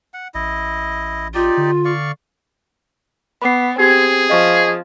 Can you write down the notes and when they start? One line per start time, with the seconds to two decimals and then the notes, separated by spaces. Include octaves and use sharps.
0.14 F#5
0.35 A1 E4 D#5
1.34 D#4 F4 G4 D5
1.57 D3
1.85 D5 F5 C#6
3.42 B3 B5 D6 C7
3.79 C4 G4 G#4 G#6
4.30 F3 D#5 F5 C#6